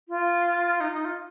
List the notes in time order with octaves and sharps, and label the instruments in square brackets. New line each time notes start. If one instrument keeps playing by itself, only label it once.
[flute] F4
D#4
D#4
F4